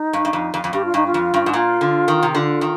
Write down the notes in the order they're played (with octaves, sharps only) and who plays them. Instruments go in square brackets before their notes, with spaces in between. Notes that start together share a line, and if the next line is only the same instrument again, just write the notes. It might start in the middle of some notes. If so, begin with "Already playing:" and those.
Already playing: [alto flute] D#4
[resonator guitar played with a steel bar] G2
G2
F2
F2
F2
[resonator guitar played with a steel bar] G2 [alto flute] G4
[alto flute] F4
[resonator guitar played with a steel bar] G2 [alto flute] D#4
[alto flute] F4
[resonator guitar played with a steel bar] F2
G2
G#2
[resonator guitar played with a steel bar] A#2 [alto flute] F4
[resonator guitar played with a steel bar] D3
D#3
C3
[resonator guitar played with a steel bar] D3 [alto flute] F4
[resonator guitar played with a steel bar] D#3